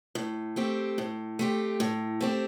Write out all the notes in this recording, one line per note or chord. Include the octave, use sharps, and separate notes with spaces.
A2
A3 C4 G4
A2
A3 C4 G4
A2
A3 C4 G4